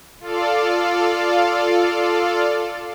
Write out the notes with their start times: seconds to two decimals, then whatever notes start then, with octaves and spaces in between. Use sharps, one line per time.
0.20 F4 A4 D5 F5